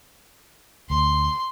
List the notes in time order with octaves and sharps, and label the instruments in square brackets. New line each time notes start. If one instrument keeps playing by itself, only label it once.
[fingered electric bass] D2 [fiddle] C6